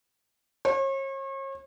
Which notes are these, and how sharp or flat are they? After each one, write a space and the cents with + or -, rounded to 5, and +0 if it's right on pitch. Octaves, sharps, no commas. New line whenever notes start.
C#5 -40